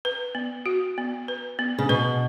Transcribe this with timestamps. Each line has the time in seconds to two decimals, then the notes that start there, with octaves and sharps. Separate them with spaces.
0.05 B4
0.35 B3
0.66 F#4
0.98 B3
1.28 B4
1.59 B3
1.79 C#3
1.89 B2 B4